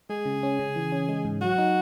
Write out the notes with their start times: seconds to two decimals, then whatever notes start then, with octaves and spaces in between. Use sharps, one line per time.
0.10 G#3 G#4
0.25 C#3
0.43 C#4
0.59 C#3
0.76 E3
0.92 C#4
1.09 G#3
1.25 G#2
1.41 F#3 F#4
1.58 D#4